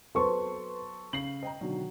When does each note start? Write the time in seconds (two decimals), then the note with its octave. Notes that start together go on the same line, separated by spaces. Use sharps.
0.15 F#3 B3 A4 B4 C5 A5 C6 C#6
1.13 C#3 C7 F#7
1.43 D#5 G5 A#5
1.61 B2 D3 D#3 F#3